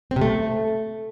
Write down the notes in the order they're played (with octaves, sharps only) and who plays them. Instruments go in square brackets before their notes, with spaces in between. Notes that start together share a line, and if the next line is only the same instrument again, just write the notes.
[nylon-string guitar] C4
C3
A3